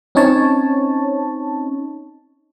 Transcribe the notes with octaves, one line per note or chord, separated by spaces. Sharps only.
C4 C#4 D#4 C#5 A5